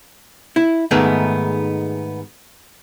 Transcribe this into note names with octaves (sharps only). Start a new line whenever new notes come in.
E4
G#2 D#3 G#3 A3 B3